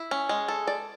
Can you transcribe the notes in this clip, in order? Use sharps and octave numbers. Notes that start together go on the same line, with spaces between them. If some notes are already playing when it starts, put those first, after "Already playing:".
Already playing: E4
C#4
G#3
A4
D5